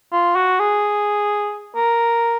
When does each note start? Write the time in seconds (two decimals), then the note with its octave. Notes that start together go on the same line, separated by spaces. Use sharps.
0.12 F4
0.36 F#4
0.59 G#4
1.76 A#4